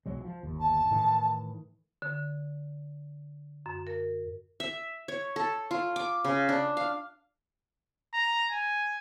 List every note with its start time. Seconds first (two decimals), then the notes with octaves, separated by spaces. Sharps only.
0.06 B1 F#3 G#3
0.21 E3 F3
0.43 G1 D#2
0.60 A5
0.91 A2 D#3 E3
2.02 D3
3.66 F#2
3.87 A#4
4.60 E5
5.08 C#5
5.36 A4
5.71 F4
5.96 D6
6.24 C#3
6.49 D4
6.77 F5
8.14 A#5
8.51 G#5